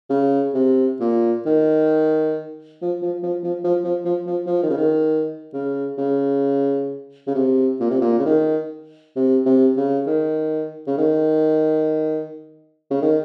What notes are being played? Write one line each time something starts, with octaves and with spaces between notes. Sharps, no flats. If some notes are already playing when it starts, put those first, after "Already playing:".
C#3
C3
A#2
D#3
F3
F3
F3
F3
F3
F3
F3
F3
F3
D#3
C#3
D#3
C#3
C#3
C#3
C3
A#2
C3
A#2
C#3
D#3
C3
C3
C#3
D#3
C#3
D#3
C#3
D#3